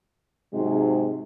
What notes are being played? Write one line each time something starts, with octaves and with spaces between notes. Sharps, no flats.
G#2 C3 F#3 G#3